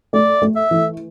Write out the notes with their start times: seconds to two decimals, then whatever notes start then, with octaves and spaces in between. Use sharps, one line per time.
0.13 A3 D5
0.42 A3
0.56 E5
0.71 E3